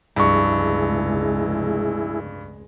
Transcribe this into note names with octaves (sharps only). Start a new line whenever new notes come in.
F1 C#2 G2 G#3 E4 G#4 C#6